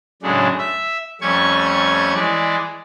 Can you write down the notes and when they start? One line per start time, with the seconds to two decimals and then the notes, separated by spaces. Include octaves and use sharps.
0.22 F#2 A2 C#3 G#3 D4
0.58 E5
1.21 F2 G3 A3 C#4 C#6 G#6
2.15 E3 G#3 D5